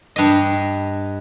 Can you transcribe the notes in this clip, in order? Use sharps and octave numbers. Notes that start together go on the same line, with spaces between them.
G2 D#5